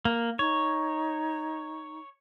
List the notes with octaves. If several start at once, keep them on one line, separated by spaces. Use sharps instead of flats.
A#3
D#4 C#5